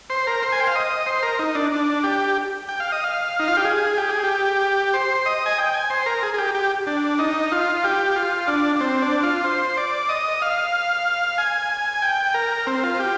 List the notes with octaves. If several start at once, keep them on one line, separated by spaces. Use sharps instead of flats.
C5
A#4
C5
G#5
G5
F5
D#5
C5
A#4
D#4
D4
D4
G4
G5
F5
D#5
F5
D#4
F4
G4
G#4
G4
G#4
G4
C5
D#5
G#5
G5
G#5
C5
A#4
G#4
G#4
G4
G4
D4
D#4
F4
G4
F4
D4
D4
C4
D4
F4
C5
D5
D#5
F5
G#5
G5
A#4
C4
F4
G4